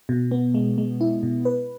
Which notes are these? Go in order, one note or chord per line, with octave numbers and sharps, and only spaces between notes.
B2
B3
G#3
G#3
E4
B2
B4